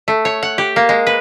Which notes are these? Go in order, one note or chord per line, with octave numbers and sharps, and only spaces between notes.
A3
C#5
F#5
G4
A#3
G#3
B4